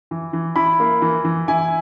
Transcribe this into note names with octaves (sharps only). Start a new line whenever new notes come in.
E3
E3
E4 B5
A#3
E3
E3
E4 G#5